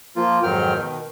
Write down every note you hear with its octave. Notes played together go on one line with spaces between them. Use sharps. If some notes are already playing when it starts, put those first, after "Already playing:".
F3 A#3 F4
F2 G#2 D#3 F#3 G5 F6
B2 D#3